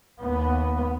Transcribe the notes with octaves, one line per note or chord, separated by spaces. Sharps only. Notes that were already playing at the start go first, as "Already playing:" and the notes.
D#2 B3